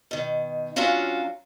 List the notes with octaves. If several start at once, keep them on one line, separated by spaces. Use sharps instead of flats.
B2 D#3
F#3 C#4 D4 F4 F#4 F5